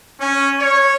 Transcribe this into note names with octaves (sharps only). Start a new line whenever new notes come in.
C#4
C#5